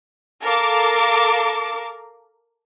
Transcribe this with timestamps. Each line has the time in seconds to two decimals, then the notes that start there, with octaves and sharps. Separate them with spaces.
0.43 A4 A#4 F5 D6